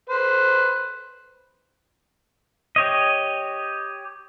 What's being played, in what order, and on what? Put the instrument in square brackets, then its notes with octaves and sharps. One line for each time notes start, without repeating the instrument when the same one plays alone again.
[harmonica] B4 C5
[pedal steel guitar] G4 C#5 D#5